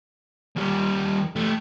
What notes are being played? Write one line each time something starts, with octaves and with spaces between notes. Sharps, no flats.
D#2 G3
A3 G4